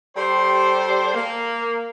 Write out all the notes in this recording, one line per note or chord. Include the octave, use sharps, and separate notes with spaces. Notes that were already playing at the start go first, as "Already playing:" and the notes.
G3 G4 A4 C5
A#3